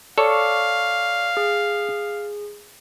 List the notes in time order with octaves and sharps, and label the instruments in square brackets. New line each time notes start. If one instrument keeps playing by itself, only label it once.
[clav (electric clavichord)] A4 C#5 [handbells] D5 C#6 D6 [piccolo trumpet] F5
[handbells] G#4